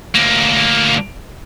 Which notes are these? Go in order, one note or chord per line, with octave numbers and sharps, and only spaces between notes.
D2 A#3